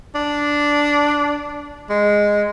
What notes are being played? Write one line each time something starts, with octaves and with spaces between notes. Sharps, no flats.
D4
G#3